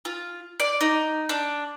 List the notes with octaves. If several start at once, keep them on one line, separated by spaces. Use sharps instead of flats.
F4
D5
D#4
D4